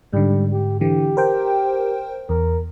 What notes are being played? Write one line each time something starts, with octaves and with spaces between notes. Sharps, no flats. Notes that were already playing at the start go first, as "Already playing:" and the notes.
G#2 D3 G3
G4
D3 E3 G4
A#4 C5 G5
E2 A#4